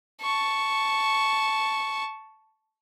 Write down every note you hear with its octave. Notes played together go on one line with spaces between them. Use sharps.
A5 C#6